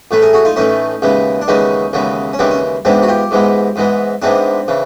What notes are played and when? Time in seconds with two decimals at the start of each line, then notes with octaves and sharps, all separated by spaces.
0.11 A2 E3 A3 B4
0.22 G#4 A#4
0.33 F#4 G#4
0.45 D#4 F4
0.56 A2 E3 A3 C#4 D#4
1.02 D#2 C#3 E3 G#3 B3
1.42 D4
1.48 D#2 C#3 E3 G#3 B3 C#4 D#4
1.93 D#2 C#3 E3 G#3 B3
2.33 C#4
2.39 D#2 C#3 E3 G#3 B3 C4 D4
2.51 C#4
2.85 G#2 E3 G#3 B3 C4 D4
3.02 F#4
3.08 F4 G4
3.31 G#2 E3 G#3 B3
3.76 G#2 E3 G#3 B3
4.22 G#2 E3 G#3 B3 C4 D4
4.68 C#3 E3